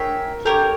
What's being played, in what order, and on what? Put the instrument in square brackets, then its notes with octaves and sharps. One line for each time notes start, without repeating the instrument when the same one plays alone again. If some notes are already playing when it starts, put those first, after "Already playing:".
Already playing: [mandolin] G#4 C#5 E5 G5 [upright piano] A#4
[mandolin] G4 A#4 C#5 [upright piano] A4